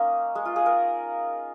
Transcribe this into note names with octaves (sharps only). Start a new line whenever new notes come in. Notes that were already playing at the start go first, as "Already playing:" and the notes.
Already playing: A#3 C#4 D#4
G#3
F4
G#4
A#4